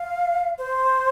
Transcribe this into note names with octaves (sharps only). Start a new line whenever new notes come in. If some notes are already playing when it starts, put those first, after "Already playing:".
Already playing: F5
C5